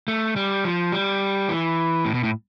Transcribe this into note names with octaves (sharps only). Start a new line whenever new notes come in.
A3
G3
F3
G3
E3
A2
B2
A2